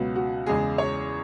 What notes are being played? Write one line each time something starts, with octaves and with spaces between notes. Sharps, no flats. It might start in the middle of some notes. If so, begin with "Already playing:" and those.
Already playing: C#2 B2 F#3 B3 F#4
F#4
E2 C#3 G#3 G#4
C#5